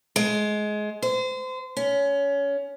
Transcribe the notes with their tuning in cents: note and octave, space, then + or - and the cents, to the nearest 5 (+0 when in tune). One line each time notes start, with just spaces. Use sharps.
G#3 +20
C5 -30
C#4 +20